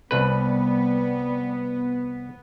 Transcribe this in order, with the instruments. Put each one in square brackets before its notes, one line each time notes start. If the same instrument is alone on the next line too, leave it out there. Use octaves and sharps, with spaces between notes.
[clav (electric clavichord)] C2 B4 [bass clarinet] G3 [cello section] B3